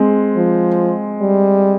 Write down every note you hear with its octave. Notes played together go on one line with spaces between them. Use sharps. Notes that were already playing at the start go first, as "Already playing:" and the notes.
Already playing: G#3 C4
F3
G3